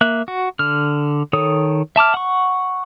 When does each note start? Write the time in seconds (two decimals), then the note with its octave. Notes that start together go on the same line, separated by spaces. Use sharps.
0.01 A#3 E5 F#6
0.28 F#4
0.59 D3 F6
1.33 D#3 A4 C#5 D#6
1.96 E5 A5 D6 F6
2.14 F#5 C#6